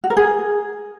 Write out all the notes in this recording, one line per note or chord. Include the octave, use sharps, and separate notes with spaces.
F#4
A#4
G#4